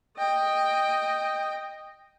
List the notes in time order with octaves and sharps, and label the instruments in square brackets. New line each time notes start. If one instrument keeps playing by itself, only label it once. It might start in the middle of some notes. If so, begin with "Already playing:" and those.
[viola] D#5 G5